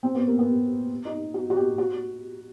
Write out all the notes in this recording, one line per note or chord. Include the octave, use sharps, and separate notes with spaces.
C4
B3
A#3
B3
D#4
F#4
F#4
G4
F#4